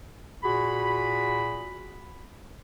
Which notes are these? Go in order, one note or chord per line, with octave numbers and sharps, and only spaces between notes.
A#2 F#4 G#4 B5